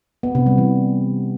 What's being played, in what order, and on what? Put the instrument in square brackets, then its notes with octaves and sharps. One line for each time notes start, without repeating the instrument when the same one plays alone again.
[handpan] B3
C3
G3
E3